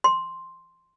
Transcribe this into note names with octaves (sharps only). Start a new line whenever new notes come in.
C6